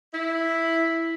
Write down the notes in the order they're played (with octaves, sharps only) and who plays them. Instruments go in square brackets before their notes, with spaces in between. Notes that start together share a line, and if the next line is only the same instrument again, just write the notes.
[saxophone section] E4